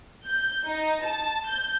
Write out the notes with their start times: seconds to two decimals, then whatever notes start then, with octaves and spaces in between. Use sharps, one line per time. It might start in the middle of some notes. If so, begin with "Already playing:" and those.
0.25 G6
0.65 D#4
1.03 A5
1.46 G6